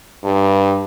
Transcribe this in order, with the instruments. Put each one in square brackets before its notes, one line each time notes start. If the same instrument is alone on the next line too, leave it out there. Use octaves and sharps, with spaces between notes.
[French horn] G2